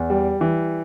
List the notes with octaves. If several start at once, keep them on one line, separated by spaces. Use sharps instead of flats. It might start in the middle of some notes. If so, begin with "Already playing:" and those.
Already playing: E2
G3
E3